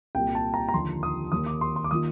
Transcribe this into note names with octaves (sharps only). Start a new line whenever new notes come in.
C2 A#2 G3 G5
A5
A#5
A#5
D#2 D3 F3 C6
D#6
D#2 D#3 A#3 D#6
D6
C6
C6
D6
D#3 A#3 F4 D#6